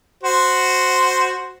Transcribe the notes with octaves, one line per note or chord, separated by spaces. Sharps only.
F#4 C5